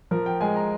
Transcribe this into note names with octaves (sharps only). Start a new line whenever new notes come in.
F3 A#4
G5
G#3 G#5
A#5